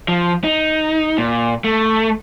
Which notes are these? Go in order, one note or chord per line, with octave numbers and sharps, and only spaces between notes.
F3
D#4
A#2
A3